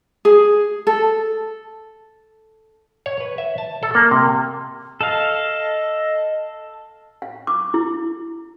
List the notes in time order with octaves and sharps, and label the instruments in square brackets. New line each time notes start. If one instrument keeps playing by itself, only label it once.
[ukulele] G#4
A4
[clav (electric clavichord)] C#5
B4
E5
A5
A4
A#3
C3
[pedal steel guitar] A4 F5 [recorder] D#5
[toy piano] F5
D6
E4